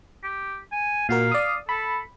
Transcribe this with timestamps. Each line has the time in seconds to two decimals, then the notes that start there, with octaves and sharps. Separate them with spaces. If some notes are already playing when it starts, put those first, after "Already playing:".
0.23 G4
0.72 G#5
1.09 A#2 F#4 A#4 F5
1.32 D5 D#6
1.69 A4 B5